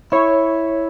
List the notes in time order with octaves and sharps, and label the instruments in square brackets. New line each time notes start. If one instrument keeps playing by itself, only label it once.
[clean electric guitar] E4 [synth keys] C#5